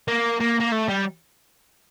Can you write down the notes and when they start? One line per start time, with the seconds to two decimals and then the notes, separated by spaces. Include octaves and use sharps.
0.08 A#3
0.40 A#3
0.60 A#3
0.72 A3
0.88 G3